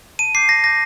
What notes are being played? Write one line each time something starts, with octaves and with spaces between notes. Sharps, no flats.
A5 D#7
D6 G6 C7
A5 A#6
D6 G6 A#6